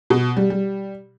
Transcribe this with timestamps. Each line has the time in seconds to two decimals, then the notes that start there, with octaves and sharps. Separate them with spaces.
0.10 B2
0.37 G3
0.50 G3